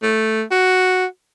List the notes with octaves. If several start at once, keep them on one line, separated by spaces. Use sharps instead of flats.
A3
F#4